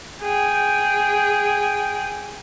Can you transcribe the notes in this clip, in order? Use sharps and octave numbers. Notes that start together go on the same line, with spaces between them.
G#4 G5